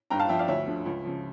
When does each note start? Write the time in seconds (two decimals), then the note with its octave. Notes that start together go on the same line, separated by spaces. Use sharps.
0.10 G2 G5 A#5
0.19 F5 A5
0.29 F3 E5 G5
0.39 D5 F5
0.48 D2 C#5 E5
0.67 D3 F3
0.86 C#2
1.05 C#3 F3